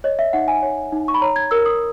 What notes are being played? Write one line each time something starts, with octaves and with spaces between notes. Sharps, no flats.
C#5 D#5
E5
D#4 F#5
G#5
C#5
D#4
C#6
B5
C#5 A#5
G#6
A#4 E6
D#6